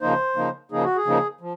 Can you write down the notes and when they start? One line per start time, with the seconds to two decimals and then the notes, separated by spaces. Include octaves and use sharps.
0.01 C#3 F3 A#3 D#4 C5
0.36 C#3 F3 A#3 D#4
0.71 C#3 F3 A#3 D#4 G#4
0.84 F#4
0.96 G#4
1.06 C#3 F3 A#3 D#4
1.41 F3